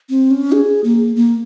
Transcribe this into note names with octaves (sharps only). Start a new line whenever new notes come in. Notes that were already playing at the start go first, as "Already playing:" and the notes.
C4
C#4
G#4
A#3
A#3